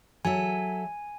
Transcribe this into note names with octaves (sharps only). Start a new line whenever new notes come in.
F#3 A4 E5 G#5